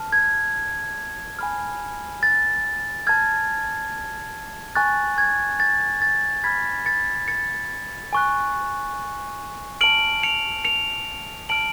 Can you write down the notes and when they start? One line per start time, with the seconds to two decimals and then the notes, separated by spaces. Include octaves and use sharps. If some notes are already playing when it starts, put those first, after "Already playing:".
Already playing: A5 F6
0.13 G#6
1.39 G#5 B5 F6
2.23 A6
3.07 A5 F6 G#6
4.75 G#5 C#6 F#6 A6
5.18 G#6
5.60 A6
6.02 A6
6.44 B5 F6 G#6 B6
6.86 A6 C#7
7.28 A6 C#7
8.13 G#5 C#6 F#6
9.81 A5 F6 D7 F#7
10.23 C#7 F7
10.65 C#7 F7
11.49 A5 F6 D7 F#7